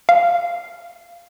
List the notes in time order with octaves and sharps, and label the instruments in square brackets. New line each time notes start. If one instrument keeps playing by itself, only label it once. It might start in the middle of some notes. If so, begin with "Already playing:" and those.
[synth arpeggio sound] F5